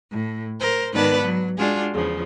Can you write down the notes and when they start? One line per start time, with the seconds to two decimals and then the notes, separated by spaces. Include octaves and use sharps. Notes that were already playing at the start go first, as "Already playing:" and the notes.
0.10 A2
0.59 A#4 C5
0.92 G#2 D#3 B3 B4 D5 A5
1.21 F#3
1.57 G#3 D4 F4 F#4 G#4
1.93 E2 C#3 F3